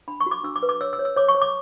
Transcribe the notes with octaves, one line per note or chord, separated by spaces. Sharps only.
D4 B5
C#6
F#4 D6
D4 E6
D6
B4
D6
C#5 E6
E6
C#5
E6
C#5 D6
C#6
C#5
D6